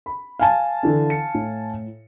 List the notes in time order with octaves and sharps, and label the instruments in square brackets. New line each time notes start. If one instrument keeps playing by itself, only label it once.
[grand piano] B5
[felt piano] F5 G#5 A5
[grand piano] D3 E3 D4
C#7
A2